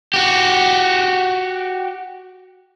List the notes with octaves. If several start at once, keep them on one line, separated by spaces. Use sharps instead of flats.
F#4 G4